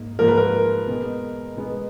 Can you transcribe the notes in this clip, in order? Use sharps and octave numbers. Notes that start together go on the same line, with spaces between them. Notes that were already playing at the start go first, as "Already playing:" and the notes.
Already playing: G#2 A#3
G#2 F3 A#3 A#4
B4
A#4
B2 G#3 B3
B2 G#3 B3